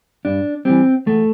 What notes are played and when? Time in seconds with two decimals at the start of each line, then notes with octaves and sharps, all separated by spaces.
0.25 G2 D4
0.65 E3 G3 C4
1.06 E2 A3